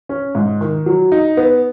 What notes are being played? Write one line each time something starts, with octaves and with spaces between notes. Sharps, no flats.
C#4
G#2
D#3
F#3
D#4
B3